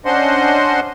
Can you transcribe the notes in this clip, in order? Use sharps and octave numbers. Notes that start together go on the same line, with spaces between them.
C#4 D4 C5 D#5 F#5 C6